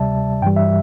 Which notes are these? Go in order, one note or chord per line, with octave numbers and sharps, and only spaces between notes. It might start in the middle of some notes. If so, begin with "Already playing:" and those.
Already playing: D2 C3 G3 D5 E5 A5
G2 E3 G3 G5
E5